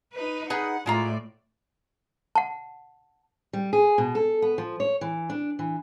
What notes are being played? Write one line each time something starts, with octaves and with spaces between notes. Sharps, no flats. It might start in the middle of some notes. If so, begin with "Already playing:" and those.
D#4 B4
D#4 G#4 B4 F#5
A2 G#3 F4 D5 A#5
F#5 A5
G3
G#4
B2
A4
B3
F3
C#5
E3
D4
E3